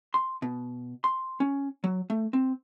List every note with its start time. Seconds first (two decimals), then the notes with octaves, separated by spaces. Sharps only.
0.14 C6
0.42 B2
1.04 C6
1.40 C#4
1.84 F#3
2.10 A3
2.33 C4